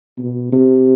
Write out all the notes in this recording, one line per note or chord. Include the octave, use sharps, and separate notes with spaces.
B2
C3